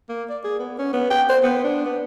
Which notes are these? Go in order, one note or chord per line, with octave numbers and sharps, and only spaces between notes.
A#3
D5
G#4
B3
C#4
B3
G5
C5
B3
D4
B3